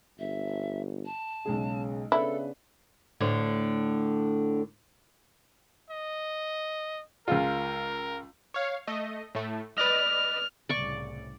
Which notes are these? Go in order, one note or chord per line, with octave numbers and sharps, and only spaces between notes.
G1 E5
A5
B1 C#3 G#3 G#4
C#3 B3 D4 E4 A4 B4
D2 A2 D3
D#5
C#2 G#3 F4 A#4
C#5 F5
A3 D#5
A2 A3
B4 D5 D#5 F6
C2 A2 C#3 D5 C#6